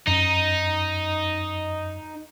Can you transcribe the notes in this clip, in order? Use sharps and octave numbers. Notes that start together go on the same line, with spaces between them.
F#2 D#4